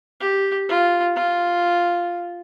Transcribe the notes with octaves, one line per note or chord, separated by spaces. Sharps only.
G4
F4
F4